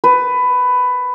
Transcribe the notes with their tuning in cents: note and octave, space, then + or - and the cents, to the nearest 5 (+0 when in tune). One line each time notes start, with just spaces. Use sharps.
B4 +15